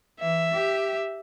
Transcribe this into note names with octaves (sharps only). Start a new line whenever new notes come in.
E3 E5
G4